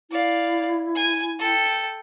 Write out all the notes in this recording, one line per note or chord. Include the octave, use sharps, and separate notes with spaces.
E4 D5 F5
G#5
A4 G5